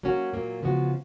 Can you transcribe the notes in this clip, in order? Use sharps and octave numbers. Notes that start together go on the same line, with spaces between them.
F#3 A#3 C#4 F#4
A#2 F#3 A#3
C#3 F3 G#3 B3 F#4